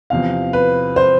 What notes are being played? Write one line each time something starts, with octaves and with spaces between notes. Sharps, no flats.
E2 C3 F3 F5
B4
C5